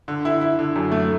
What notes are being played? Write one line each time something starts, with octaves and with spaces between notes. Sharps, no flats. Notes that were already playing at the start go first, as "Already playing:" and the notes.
D3
E4
E4
D3
F#2
A3